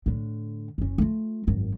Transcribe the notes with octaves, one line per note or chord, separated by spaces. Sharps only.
A2 D3
F#1 C#4
A3 F4
G#1 F#2